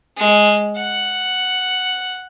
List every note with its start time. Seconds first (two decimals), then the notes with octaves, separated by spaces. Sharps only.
0.17 G#3
0.76 F#5